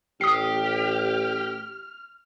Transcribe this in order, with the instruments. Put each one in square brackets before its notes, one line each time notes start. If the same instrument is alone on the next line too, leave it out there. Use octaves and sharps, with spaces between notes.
[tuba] A1 [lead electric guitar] G4 [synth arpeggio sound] D#6 C7 [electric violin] F6